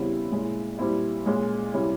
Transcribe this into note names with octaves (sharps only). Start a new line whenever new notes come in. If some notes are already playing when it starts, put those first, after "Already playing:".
Already playing: E2 C#3 G3 C4 E4
A#2 G#3 C#4 E4
A#2 G3 C4 E4
A#2 G#3 C#4
C3 G3 C#4 E4